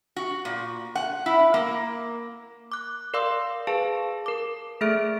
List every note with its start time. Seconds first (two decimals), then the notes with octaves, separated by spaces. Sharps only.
0.16 F#4
0.45 A#2
0.95 F#5
1.26 E4
1.54 A#3
2.72 D6 F#6
3.14 A#4 D5 F5 C6 D6 E6
3.67 G#4 B4 F5 A5
4.26 A#4 D6
4.81 A3 G#4 A4 E5 F6 D7